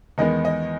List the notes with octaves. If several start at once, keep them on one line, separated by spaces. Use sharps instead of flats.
E2 D#3 G#3 B3 D#5
D#5